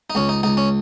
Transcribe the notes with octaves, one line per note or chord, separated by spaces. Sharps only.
D#4
C#2 C#4
D#4
C#2 D#4
C#4